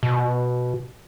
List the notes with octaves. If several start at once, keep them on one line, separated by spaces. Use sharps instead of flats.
B2